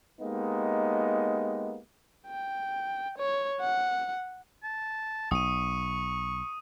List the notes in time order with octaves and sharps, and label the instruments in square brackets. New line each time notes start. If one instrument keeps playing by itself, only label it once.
[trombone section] G#3 A#3 B3 D#4 G4
[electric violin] G5
C#5
F#5
[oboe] A5
[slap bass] B1 [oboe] C#6 [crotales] D#6 D#7